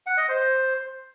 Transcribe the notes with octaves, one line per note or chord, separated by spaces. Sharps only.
F#5
D#5
C5